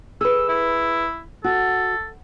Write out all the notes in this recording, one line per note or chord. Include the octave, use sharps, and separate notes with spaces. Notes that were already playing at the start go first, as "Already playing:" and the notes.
G#4 B4 E6
E4
F#4 A4